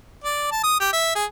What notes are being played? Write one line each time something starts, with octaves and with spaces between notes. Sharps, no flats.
D5
A5
D#6
G4
E5
G#4